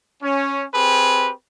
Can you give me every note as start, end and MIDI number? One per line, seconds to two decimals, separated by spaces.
0.23 0.65 61
0.74 1.32 60
0.74 1.32 67
0.74 1.32 68
0.74 1.32 71